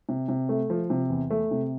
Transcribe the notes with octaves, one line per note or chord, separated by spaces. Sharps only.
C3
C3
A3
F3
C3
E2
A3
C3